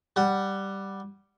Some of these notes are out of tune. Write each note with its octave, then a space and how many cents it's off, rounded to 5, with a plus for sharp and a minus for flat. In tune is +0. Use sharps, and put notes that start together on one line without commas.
G3 +0 F#5 +10